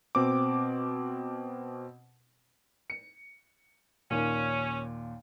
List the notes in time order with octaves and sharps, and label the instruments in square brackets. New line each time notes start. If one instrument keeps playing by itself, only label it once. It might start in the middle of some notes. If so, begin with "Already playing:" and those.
[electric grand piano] B2 C4 D6
[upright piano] C#7
[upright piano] D#2 A#2 [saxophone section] C#4